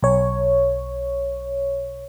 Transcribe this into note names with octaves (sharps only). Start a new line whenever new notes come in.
B1 C#5